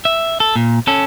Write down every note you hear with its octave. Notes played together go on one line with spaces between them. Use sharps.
E5
A4
A#2
C#4 A4